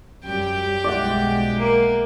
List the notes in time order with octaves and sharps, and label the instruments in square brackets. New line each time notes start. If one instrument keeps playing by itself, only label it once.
[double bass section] F#2 G3 [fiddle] G4 G5
[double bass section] B1 G#3 [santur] D5 E5 F#5
[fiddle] A#3